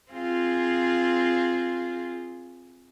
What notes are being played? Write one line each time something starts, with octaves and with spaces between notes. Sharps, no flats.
C4 F4 G#4